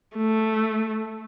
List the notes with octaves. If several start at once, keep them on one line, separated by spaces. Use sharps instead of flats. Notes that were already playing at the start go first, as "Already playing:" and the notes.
A3